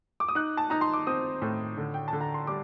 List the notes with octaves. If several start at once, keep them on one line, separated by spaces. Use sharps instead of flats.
D6
D#6
D#4 F#6
A5
D#4 A#5
C6
D6
C4 D#6
A2
D3
G5
A5
D3
A#5
C6
G3 D6